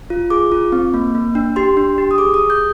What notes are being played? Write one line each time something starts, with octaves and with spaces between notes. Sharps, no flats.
F4
G#4 D6
F4
C4
A#3
A#3
D4
G4 C6
D4
G4
D#6
G#4 D6
G#4 D#6
G6